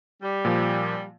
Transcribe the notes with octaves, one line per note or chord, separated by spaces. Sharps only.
G3
A#2 F3